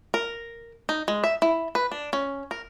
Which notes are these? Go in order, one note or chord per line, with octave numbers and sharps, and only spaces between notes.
A#4
D#4
G#3
E5
E4
B4
D4
C#4
A#4